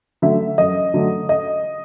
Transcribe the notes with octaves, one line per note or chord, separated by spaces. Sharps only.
D3 F#3 A3 E5
F#2 D#5
D3 F#3 A3 D4
D#5